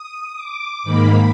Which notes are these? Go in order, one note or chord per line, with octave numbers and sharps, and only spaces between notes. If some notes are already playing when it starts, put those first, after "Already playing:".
Already playing: D#6
D6
G#2 D#3 A#3 B5